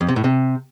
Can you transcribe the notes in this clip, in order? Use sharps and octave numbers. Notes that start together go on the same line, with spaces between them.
F2
C3
A2
C3